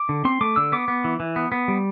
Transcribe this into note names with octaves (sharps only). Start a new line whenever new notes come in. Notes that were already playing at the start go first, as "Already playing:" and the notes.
Already playing: D6
D3
C4 C6
A3 D6
D3 E6
B3 D6
B3
E3
E3
B3
B3
G3